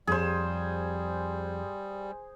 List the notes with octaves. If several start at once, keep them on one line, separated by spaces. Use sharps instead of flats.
F2 G3 G4 G#4 C5